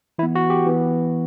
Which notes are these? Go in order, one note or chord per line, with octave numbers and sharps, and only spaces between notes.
E3 B3 E4
F#4
G4
E3 B3